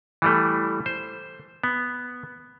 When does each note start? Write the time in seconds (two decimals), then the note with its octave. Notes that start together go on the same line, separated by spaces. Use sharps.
0.22 E3 G3 A3
0.86 C5
1.64 B3